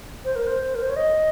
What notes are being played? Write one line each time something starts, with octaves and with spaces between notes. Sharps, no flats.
C5
A#4
C5
A#4
C5
C#5
D#5